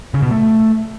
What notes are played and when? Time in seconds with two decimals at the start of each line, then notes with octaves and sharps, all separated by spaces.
0.14 C#3
0.22 B2
0.31 A3